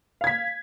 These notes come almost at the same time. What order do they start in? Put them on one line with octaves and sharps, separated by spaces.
F5 G#6 B6